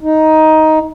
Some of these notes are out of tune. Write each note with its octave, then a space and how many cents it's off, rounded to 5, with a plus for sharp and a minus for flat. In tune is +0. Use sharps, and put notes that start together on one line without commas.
D#4 +10